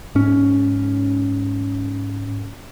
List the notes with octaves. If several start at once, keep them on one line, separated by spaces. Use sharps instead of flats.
G#2 C#4